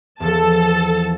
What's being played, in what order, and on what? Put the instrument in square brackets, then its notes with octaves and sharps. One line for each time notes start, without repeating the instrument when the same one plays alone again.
[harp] E2 F3 [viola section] A4 A5